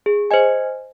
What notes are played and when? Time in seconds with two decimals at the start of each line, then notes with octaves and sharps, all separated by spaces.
0.06 G#4
0.31 C5 D#5 G#5